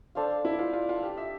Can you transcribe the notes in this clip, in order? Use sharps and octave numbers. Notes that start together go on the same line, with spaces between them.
D4 A4 C5 F5
E4
F4
F4
F4
G4
E5